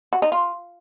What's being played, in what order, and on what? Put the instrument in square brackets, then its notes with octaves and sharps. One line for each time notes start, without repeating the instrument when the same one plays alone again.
[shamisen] F#4
D#4
F4